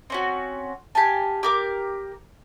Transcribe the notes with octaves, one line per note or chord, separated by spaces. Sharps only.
C4 C#4 F#4
G4 F5 G#5 A5
G4 A#4 D6